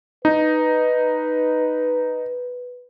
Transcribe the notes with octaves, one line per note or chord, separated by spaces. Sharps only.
D#4 B4